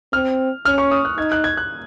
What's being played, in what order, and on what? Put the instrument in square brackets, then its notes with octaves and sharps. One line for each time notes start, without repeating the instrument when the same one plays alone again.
[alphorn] C4 [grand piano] F6
[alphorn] C#4 [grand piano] F6
[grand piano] C#6
D#6
F#6
[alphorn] D#4 [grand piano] G#6
[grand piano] F#6
G#6
F#6